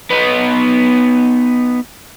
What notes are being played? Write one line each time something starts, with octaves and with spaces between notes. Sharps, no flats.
B3 D#4